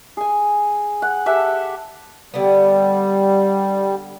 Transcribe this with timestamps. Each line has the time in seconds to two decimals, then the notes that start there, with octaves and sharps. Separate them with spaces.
0.17 G#4 G#5
1.02 F#5
1.26 G4 A4 E5 F#5
2.34 D3 G3 B3